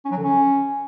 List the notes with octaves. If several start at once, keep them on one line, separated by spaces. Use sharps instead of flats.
C#4
F#3
D3
C#4